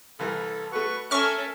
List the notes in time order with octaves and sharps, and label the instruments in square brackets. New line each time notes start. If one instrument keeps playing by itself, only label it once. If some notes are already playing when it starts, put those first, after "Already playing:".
[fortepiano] C2 E3 A#4 [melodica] A4
[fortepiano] A3 F#4 [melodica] B4 C#6
[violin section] C#4 A4 [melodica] A#4 E5 [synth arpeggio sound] C#6 F6